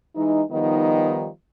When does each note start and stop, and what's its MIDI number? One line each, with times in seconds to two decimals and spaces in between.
0.15 0.42 52
0.15 0.42 56
0.15 0.42 63
0.51 1.28 51
0.51 1.28 53
0.51 1.28 55
0.51 1.28 59
0.51 1.28 63